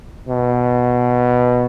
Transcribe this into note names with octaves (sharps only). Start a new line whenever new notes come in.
B2